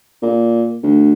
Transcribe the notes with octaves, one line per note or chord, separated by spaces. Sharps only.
A#2
D2